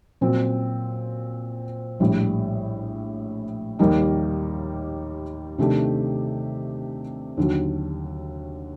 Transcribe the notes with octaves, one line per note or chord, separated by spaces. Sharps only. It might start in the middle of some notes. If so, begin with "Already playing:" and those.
A#2 F#3 C4
A#1 A2 G3
D#2 D#3 G3 A#3 D#4
C3 D#3 A3 D4 G4
D#2 D3 F#3